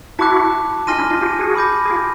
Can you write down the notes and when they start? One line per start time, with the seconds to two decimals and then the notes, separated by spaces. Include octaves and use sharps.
0.19 E4 F#4 A5 D6 F#6
0.87 D#4 F4 G#5 C6 F6 A#6 D#7
0.98 D4 E4
1.10 D#4 F4
1.21 F4 G4
1.39 F#4 G#4
1.55 B5 D6 G6 A#6
1.85 G#4
1.90 F4 G4